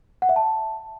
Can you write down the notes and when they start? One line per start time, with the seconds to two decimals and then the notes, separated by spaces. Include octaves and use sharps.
0.22 F#5
0.29 E5
0.36 A5